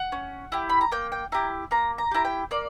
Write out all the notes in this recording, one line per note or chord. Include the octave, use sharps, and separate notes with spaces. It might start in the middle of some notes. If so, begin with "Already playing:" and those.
Already playing: F#5
C#4
E4 G4
B5
A#5
A#3 G5
G5
E4 G4 A#5
A#3 A#5
A#5
E4 G4 A#5
G5
A#3 D5